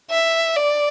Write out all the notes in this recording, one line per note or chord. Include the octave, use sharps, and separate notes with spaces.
E5
D5